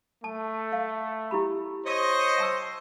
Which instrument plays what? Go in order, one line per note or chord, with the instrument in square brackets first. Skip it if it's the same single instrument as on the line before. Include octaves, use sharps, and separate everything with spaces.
[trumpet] A3 [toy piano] A5
[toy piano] F5
E4 G4 B5
[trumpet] C5 [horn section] C#5 D#5
[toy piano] G5 A5 E6